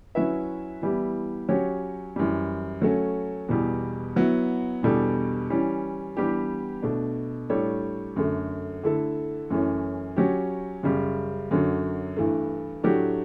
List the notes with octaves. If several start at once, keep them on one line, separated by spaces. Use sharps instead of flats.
F#3 C#4 E4 B4 E5
E3 G3 B3 E4 G4
F#3 C#4 G4 C#5
F#2 E3 G3
F#3 A3 C#4
E2 B2 G3
F#3 B3 E4
E2 B2 G3 D4 A4
E3 G3 C#4
E3 G3 B3 D4 G4
B2 A3 D4
A2 G3 D4 A4 C#5
F#2 D3 A3
D3 A3 E4 A4
F#2 E3 A3 C#4
F#3 C#4 G4
F#2 C#3 G3
F#2 D3 F#3
G2 E3 A3
A2 F#3 A3 D4 G4